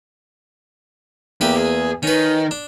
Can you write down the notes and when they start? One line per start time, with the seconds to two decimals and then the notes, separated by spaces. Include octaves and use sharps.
1.41 E2 A#3 G4 B4
1.57 G#4
2.03 D#3 C#4 B4
2.51 D4